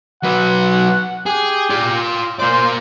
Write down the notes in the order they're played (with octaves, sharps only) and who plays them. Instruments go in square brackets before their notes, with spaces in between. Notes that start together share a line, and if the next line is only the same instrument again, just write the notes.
[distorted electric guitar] F#3 B4 [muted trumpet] F#5
[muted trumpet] G4 [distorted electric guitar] G#4
[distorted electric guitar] F4 D5
[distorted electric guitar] A#3 D5 [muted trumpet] C5